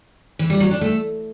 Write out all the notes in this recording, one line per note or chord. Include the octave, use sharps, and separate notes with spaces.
E3
G3
F#3
D4
A3